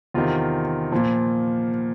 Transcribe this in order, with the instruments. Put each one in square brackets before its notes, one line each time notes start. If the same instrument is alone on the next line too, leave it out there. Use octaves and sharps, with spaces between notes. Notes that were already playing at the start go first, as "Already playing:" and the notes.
[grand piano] E2 C3 D#3 F4
A#2 F3